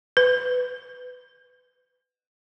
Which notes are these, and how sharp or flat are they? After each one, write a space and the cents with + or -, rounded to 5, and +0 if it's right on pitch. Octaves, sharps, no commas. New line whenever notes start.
B4 +15